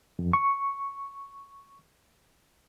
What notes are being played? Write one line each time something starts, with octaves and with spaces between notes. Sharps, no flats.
F2
C#6